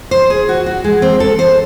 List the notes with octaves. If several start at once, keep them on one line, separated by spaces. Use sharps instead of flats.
C5
G#4
F#4
F#4
G#3
C4
A4
C5